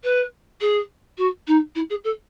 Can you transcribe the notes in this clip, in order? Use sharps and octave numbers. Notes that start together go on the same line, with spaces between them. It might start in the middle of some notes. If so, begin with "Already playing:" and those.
B4
G#4
F#4
D#4
E4
G#4
A4